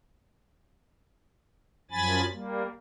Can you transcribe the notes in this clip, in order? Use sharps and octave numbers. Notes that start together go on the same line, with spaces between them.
F#2 F3 G#5 B5 A6
G3 A#3